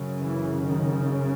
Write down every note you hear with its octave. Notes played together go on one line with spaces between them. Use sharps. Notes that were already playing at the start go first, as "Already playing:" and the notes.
Already playing: F#2 C#3
E3
D#3